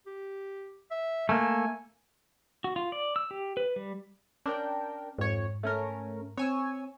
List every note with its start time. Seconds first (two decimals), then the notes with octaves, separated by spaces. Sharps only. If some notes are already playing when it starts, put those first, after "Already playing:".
0.07 G4
0.91 E5
1.29 A3 A#3 G#5
2.64 F#4
2.76 F4
2.92 D5
3.16 E6
3.31 G4
3.57 B4
3.76 G3
4.46 C#4 D4 A#4 G5
5.19 F2 G#2 C#5
5.63 A3 C#4 A#4
6.38 C4 C#5 G#5 E6